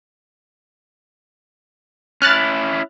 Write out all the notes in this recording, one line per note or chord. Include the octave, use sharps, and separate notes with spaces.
C#4 E4 F6 F#6 A6